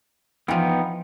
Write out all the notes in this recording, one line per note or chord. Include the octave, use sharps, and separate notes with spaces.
E3 F3 B3 D#4 G5